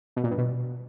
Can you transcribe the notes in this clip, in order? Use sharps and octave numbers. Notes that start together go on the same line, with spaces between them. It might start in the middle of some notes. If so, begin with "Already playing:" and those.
B2
A#2
G2
B2